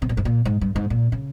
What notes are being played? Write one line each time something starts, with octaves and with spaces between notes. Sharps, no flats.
C3
A#2
G#2
A#2
G#2
G2
G#2
A#2
C#3